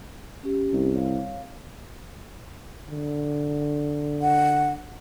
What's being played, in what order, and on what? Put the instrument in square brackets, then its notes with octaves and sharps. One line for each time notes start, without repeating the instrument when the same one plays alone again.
[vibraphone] C#4 G4
[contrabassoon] C2
[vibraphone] C#5 F5
[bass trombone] D3
[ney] F#5